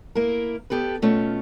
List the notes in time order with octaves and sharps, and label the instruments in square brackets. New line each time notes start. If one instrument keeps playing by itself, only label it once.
[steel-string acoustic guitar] A#3 E4 A#4
B3 G4 A4 B4
B2 A3 C#4 F4